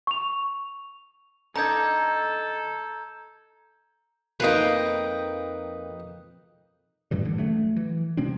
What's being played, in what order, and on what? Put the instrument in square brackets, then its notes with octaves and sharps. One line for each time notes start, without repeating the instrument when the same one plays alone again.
[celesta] C#6 F7
[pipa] D3 D#4 [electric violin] A4 [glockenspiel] A#5 G6 G#6
[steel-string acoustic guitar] F2 A#3 G5 [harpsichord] D#4 B4
[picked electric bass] F#2 A2 E3 G3
A1 D3
F#3 A3
E3
C3 G#3 C4 D4